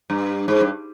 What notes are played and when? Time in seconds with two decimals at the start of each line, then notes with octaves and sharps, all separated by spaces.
0.10 G2
0.48 G#2
0.61 G2